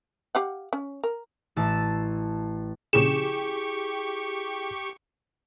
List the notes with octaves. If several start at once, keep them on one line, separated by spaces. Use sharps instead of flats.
G4 F5 F#5
C#4
A#4
A1 A5 E6
A#1 C#3 E4 G4 G#4 C#6 E7